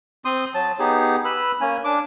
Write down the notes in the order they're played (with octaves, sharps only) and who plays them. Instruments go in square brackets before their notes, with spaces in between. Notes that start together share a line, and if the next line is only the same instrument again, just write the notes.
[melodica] C4 C6 D#6
F#3 A5
B3 D#4 G4 G#4
B4 B5 E6
A#3 C#4 G#5
D4 D6